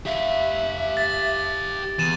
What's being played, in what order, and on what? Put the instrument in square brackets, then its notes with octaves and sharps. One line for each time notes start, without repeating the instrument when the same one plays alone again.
[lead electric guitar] G4 F5 [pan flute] E5
[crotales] A6
[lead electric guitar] E2 [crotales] A6 D#7 E7